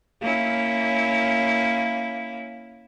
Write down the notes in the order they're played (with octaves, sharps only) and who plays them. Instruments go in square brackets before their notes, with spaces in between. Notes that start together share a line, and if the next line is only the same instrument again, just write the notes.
[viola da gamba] A#3 C#4 E4